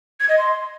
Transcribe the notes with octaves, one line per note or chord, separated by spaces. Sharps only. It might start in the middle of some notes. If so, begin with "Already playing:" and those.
G#6
D#5
C6